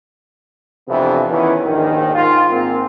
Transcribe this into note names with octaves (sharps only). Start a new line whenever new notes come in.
F2 C3 E3 B3 D4
D#3 E3 B3 C#4
A#1 D#2 G#2 D#3
G#2 D#3 D#4 F4
G#2 A#3 C4